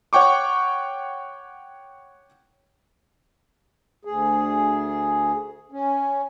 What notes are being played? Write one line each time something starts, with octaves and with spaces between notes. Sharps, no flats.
C#5 F#5 G5 C#6 D6
D2 G#4
C#4